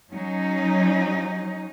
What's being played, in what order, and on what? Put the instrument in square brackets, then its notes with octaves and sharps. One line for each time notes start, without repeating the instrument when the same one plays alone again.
[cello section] F#3 C#4 D#4